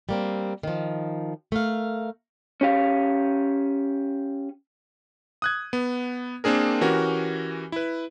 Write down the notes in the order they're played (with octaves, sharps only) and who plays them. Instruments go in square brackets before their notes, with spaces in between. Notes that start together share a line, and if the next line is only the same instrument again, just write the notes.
[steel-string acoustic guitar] G3 A#3 C4
D#3 F3
A3 A#4 F5
[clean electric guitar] C#4 G4 F5
[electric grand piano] D#6 F#6 G#6
B3
A#3 C4 D4 G#4 A#4
E3 C#4 F#4 G4 A#4
E4 B4